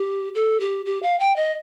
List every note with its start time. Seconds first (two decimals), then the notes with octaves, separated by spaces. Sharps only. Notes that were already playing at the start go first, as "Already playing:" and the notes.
Already playing: G4
0.35 A4
0.60 G4
0.86 G4
1.03 F5
1.20 G5
1.36 D#5